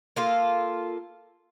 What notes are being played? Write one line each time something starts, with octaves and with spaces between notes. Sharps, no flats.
A#3 F4 A4